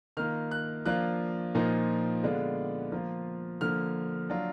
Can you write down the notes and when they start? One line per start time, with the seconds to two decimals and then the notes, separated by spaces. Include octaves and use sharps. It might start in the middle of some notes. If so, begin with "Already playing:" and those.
0.17 D#3 A#3 F4 F6
0.51 F#6
0.86 F3 A#3 D4 F4 F#6
1.55 A#2 F3 A#3 D#4
2.23 D3 G#3 B3 D4 F4
2.92 F3 A#3 F4
3.61 D3 F3 A#3 F6
4.30 F#3 D4 F4